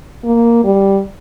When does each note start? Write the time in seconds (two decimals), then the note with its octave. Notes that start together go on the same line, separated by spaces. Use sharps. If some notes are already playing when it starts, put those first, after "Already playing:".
0.24 A#3
0.64 G3